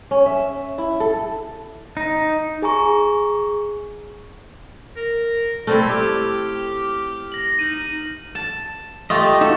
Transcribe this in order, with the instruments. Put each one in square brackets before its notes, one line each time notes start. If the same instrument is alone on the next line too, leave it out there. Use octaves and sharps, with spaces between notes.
[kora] C#4
E5
E4
A4
[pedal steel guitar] D#4
[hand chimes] G#4 G#5 A#5 C#6
[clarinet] A#4
[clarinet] G3 [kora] A3 C4 E4 [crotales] F6
[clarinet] G4
[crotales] A#6 F#7
[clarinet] D#4 [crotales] D#7
[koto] A5
[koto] A3 F4 A4 [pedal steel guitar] G4 D#5
[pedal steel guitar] D#4 F#4 [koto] A4